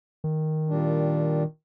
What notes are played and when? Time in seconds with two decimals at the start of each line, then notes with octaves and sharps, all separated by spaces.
0.24 D#3
0.69 A#2 G3 D4